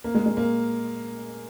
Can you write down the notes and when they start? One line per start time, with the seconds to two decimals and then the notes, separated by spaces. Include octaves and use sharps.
0.04 A#3
0.15 G#3
0.26 G#3
0.37 A#3